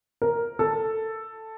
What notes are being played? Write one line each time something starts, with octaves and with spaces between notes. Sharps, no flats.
A#4
A4